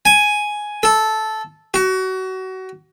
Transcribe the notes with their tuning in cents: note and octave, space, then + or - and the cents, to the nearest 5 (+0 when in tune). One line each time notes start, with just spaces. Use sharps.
G#5 +5
A4 -10
F#4 +25